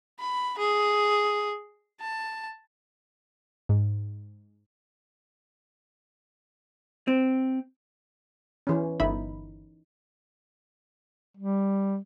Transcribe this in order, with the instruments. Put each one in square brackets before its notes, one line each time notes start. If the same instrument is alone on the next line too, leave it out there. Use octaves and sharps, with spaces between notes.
[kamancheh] B5
G#4
A5
[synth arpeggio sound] G#2
[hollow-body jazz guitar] C4
[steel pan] E3 C#4
[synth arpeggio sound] G1 E5 B5 [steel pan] D#4
[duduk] G3